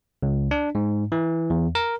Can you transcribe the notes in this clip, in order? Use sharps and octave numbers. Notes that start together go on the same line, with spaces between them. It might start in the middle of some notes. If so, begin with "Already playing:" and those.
C#2
D4
G#2
E3
E2
A#4